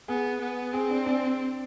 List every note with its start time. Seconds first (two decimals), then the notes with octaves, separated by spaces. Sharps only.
0.08 B3 G#4
0.41 B3
0.73 C4 G#4
0.90 D4
1.06 D4